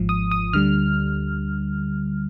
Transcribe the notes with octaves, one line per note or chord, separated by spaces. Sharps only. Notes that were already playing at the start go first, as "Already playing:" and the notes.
Already playing: G#1 G#2 F3
D#6
D#6
D2 D3 G3 F6